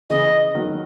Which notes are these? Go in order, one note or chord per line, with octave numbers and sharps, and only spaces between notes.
C#3 E3 D#5
D#3 F#3